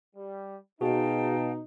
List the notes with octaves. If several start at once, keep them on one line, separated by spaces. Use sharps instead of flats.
G3
B2 D#4 F#4 G#4 F5 G5 A5